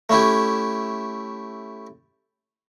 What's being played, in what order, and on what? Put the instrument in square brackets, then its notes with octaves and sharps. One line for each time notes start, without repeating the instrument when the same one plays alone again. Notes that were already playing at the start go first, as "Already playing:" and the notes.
[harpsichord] A3 C#4 E4 G4